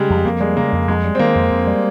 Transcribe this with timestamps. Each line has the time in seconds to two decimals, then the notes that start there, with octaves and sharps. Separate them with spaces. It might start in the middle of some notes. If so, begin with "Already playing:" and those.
Already playing: C#3 G3 G#3
0.10 F2
0.25 F2 A#3
0.40 G3 G#3
0.56 C#3 A#3
0.72 F2
0.88 F2 G#3
1.04 G3
1.15 C4
1.19 D#3 A#3
1.35 F2
1.51 F2
1.67 G3